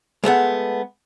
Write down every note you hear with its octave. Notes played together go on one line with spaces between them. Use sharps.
G#3 A3 B3 F#5